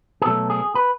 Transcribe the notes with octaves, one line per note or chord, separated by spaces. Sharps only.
G#4
B2 F#3 A3 A4
G#4
B4